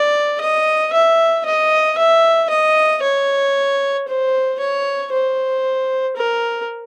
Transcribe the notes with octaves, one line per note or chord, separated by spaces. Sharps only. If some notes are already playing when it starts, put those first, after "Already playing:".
Already playing: D5
D#5
E5
D#5
E5
D#5
C#5
C5
C#5
C5
A#4